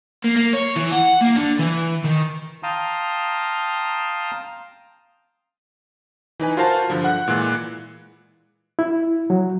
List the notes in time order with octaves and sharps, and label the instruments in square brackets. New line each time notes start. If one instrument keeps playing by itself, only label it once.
[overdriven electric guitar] A#3
A#3
C#5
E3
F#5
A#3
D3
E3
D#3
[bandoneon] F5 G5 A5 A#5 C6 D#6
[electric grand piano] E3 D#4 B4 G#5
F4 F#4 A#4 C5 F5 A5
G2 D3 F3
F#5 F#6
A#2 E3 G#3 F#6
[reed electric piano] E4
F#3